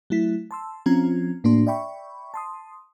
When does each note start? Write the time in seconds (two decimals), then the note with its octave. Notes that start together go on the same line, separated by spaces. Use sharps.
0.10 F#3 A3 E4 B6
0.51 A5 C6 E6
0.86 F3 C4 C#4 F4 A#5 G#6
1.44 A2 A#3 D4 F#4 C6
1.67 D5 E5 G5 B5 C#6
2.34 A5 C6 D#6